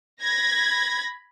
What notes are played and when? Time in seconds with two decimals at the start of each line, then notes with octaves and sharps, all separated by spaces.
0.21 B5 G#6 A#6